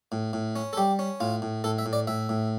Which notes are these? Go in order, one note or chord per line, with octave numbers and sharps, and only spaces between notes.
A2
A2
C#4
A4
G3 G4
C#4
A2 F4
A2
A2 A4
E5
A2
D5
A2 E5
A2